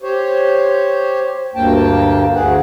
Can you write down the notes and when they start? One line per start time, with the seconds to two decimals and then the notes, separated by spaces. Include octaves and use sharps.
0.02 G4 C5 C#5
1.55 D2 G2 A#3 G5 A5
2.35 D2 G#4 F#5